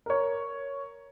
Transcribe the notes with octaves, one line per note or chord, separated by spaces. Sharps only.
A#4 C#5